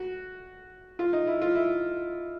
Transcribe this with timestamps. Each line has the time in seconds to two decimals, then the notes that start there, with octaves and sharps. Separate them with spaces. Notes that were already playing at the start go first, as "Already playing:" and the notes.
Already playing: F#4
0.99 F4
1.13 D#4
1.27 E4
1.41 F4
1.55 E4